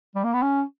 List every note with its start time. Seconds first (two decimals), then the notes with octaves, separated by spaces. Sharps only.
0.15 G3
0.24 A#3
0.33 B3
0.42 C#4